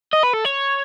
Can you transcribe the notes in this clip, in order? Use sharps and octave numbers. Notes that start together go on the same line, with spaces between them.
D#5
B4
A4
C#5